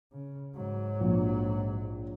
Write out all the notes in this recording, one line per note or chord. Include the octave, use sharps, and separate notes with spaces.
C#3
G#2 F#3
A#1